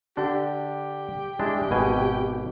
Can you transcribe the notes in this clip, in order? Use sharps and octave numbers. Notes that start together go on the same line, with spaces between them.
D3 D4 G4
G#3 D4 E4
G#1 B2 G#5